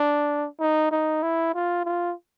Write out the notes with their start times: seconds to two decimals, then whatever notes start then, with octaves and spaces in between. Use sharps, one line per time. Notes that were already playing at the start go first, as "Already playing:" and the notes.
Already playing: D4
0.60 D#4
0.91 D#4
1.23 E4
1.54 F4
1.85 F4